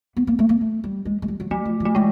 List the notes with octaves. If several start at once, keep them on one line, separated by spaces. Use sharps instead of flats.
B3
A#3
A3
A#3
A3
G3
G#3
G#3
G3
F#3
F#3 A3
F3
F3
A3
E3 G#3